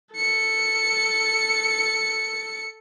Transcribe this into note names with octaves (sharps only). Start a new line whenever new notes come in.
A4 C#7